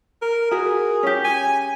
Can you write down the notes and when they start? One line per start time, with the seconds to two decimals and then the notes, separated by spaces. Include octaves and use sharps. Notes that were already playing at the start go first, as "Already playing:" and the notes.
0.22 A#4
0.51 F#4 G#4 A#4
1.03 C#4 G4
1.24 G#5